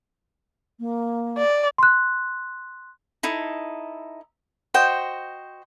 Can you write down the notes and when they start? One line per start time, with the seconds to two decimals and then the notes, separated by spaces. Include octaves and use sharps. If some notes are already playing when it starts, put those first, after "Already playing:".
0.80 A#3
1.38 D5
1.78 C6 F#6
3.23 D#4 E4 A4
4.74 F#4 C5 D#5 G5